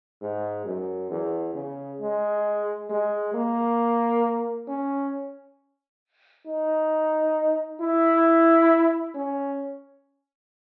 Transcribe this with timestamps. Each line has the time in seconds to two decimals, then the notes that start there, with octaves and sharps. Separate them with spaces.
0.21 G#2
0.65 F#2
1.11 E2
1.54 C#3
2.00 G#3
2.89 G#3
3.34 A#3
4.68 C#4
6.46 D#4
7.80 E4
9.15 C#4